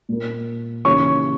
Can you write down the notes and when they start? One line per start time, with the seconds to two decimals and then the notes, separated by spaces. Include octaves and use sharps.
0.09 A#2 A#3
0.85 D#2 C#3 E3 C#5 C#6